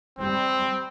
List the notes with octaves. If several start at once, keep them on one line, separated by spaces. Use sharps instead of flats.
G3 C4